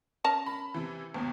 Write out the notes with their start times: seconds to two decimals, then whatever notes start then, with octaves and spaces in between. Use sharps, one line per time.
0.24 C#4 A#4 A5
0.46 B5
0.74 C3 E3
1.14 G1 D#2 B2